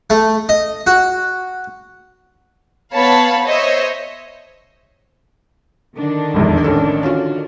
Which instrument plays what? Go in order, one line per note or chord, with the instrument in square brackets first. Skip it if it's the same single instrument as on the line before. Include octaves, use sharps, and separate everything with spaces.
[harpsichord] A3
D#5
F#4
[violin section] B3 C#5 F5 A5 B5
C5 C#5 D#5 E5
[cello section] D3 D#3 D4
[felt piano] F1 A#1 E2
A1 C#4 A4
C#4 F4 F#4